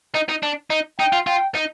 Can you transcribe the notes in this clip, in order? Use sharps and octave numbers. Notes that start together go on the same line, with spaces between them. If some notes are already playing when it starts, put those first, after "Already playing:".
D#4
D#4
D4
D#4
D#4 G5
F4
F4 G5
D#4